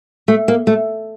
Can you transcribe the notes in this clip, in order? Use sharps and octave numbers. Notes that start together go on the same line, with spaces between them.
A3
A#3
A3